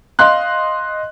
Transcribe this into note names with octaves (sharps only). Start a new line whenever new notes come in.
D#5 F5 C6 F#6